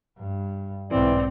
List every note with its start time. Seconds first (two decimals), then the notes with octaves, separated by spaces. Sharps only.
0.18 G2
0.91 B1 G#2 E3 C4 D5